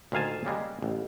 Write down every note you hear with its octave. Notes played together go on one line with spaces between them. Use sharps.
D2 A#2 D#3 F5 G#5 A5
C#3 G3 G#3 A#3
A1